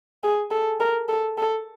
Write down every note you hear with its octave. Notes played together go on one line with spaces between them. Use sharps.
G#4
A4
A#4
A4
A4